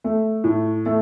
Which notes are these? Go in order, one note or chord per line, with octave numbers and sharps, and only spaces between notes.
A3
A2
A3